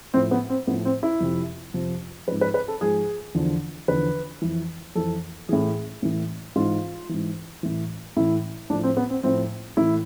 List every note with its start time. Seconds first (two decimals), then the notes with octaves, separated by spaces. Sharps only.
0.14 A2 F3 C4
0.31 B3
0.50 C4
0.67 A2 F3 B3
0.85 C4
1.03 E4
1.20 F2 C3 F3
1.74 F2 C3 F3
2.28 G#2 F3 B4
2.41 B4
2.54 B4
2.68 A4
2.81 G#2 F3 G#4
3.35 E2 D3 F3
3.88 E2 D3 F3 B4
4.42 F2 E3
4.95 F2 E3 A4
5.49 A2 E3 G#4
6.03 A2 E3
6.56 G#2 E3 F4
7.09 G#2 E3
7.63 A2 E3
8.17 A2 E3 E4
8.70 A2 F3 D4
8.83 C4
8.97 B3
9.10 C4
9.23 A2 F3 C4
9.77 A2 E3 E4